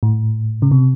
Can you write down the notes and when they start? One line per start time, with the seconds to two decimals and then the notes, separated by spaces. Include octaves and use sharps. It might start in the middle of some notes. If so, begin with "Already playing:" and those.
0.03 A2
0.62 C#3
0.71 C3